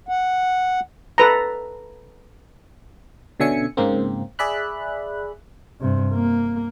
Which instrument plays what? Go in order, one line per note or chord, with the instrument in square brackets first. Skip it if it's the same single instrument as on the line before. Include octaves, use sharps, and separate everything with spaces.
[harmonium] F#5
[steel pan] A4 B4 A#5
[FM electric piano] B2 D3 C#4 E5 G#5 C#7
G#2 C#3 A#3 C4
G#4 D5 E5 B5 F#6
[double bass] G2 C3
A#3